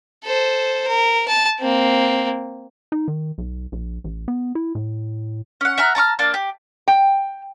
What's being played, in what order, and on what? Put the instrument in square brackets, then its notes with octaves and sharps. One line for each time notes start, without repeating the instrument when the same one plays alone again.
[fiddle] A4 C5
A#4
A5
A#3 C4
[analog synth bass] D#4
D#3
B1
A#1
A1
B3
E4
A2
[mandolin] C#4 F#5
E5 F#5 A#5 F6
A5 A#5 C#6 F6
A#3 D4 A5
G4
[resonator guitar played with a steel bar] G5